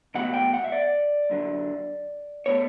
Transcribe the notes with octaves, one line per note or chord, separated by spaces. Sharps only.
C#2 B2 F#3 A3 F#5
G5
F#5
E5
D5
F#2 D3 F#3
B2 A3 C#5